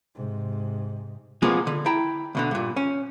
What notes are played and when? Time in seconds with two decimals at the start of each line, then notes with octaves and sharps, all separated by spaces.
0.16 G#2 C3
1.42 C3 F3 G#3 A#3 B3 G#4
1.67 D3
1.86 E4 G5 A5 A#5
2.35 D2 B2 D3
2.51 G2 A#2
2.76 C#4